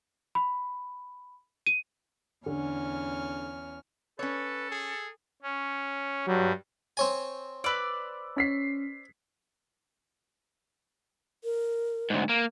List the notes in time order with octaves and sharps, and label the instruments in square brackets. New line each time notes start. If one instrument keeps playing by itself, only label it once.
[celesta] B5
D#7
[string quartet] E2 C#4 F6 [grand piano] D3
[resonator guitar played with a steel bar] C#4 C#5 [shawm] A4 [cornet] B4
[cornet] G#4
[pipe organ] C#4
[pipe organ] G2 G3 [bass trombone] F#3
[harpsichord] C4 C#5 G#5
[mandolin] B4 D5 [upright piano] E6
[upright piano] C#4 B6 C7
[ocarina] A#4
[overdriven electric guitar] D2 G#2
A#3